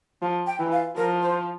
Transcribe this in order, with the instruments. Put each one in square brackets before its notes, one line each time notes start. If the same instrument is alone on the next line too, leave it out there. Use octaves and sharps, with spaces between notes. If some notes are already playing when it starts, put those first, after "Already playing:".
[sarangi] F3
[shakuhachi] G5
[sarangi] E3
[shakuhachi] F5
[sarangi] F3 [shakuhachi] A#4
[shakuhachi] C5